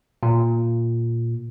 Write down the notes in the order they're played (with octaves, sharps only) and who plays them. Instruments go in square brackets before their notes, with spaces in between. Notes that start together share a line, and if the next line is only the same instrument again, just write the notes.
[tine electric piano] A#2